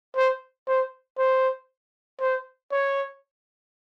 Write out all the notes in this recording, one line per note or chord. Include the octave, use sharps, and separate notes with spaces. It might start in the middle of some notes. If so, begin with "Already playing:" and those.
C5
C5
C5
C5
C#5